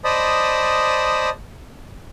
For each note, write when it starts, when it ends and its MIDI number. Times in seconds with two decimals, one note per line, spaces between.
0.05 1.29 72
0.05 1.29 74
0.05 1.29 75
0.05 1.29 81
0.05 1.29 83
0.05 1.29 87